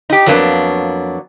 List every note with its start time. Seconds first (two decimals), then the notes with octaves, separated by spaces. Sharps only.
0.10 D#4 G4
0.26 F2 F#3 A#3 B3 D4